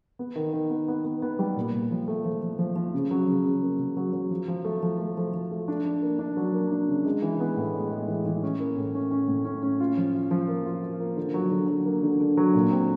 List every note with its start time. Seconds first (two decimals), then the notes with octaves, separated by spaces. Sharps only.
0.19 B3
0.36 D#3
0.53 D#3
0.70 B3
0.88 B3
1.05 B3
1.22 B3
1.39 G3
1.56 A#2
1.74 A#2
1.91 F3
2.08 A3
2.25 F3
2.42 F3
2.59 F3
2.76 F3
2.94 C#3
3.11 F#3
3.28 C#3
3.46 C#3
3.62 A#3
3.79 C#3
3.97 F#3
4.13 F#3
4.31 F3
4.48 F3
4.65 A3
4.83 F3
4.99 A3
5.17 F3
5.34 F3
5.51 A3
5.68 D4
5.85 D4
6.02 A#3
6.19 D4
6.37 F#3
6.54 A#3
6.71 D4
6.88 C#3
7.05 G#3
7.22 E3
7.40 B3
7.57 A2
7.74 G#3
7.91 G#3
8.08 E3
8.26 E3
8.43 C#4
8.60 A#3
8.77 A2
8.95 C#4
9.11 C#4
9.28 A2
9.45 C#4
9.63 C#4
9.80 F4
9.97 F3
10.15 F4
10.31 F3
10.48 A#3
10.66 F4
10.83 F4
11.00 A#3
11.17 D3
11.34 F#3
11.52 D3
11.68 F#3
11.86 A#3
12.03 D3
12.20 D3
12.37 F#3
12.54 A#2
12.71 C4